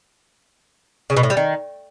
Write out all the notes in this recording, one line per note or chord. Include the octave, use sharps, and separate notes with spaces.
C#3
B2
A2
G3
D#3